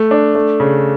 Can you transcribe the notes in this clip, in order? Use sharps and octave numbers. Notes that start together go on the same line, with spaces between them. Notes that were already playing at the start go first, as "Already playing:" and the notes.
Already playing: A3
D4
A3
C#3